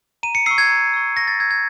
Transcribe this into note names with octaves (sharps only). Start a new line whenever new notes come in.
A#5 D#7
C#7
C#6 E6 C7
G#6
A#5
C#6 E6
C#6 A#6
A6
E6 G6 G#6
G#6